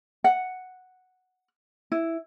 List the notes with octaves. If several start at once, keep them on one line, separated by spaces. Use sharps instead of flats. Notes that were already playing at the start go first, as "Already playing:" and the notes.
F#5
E4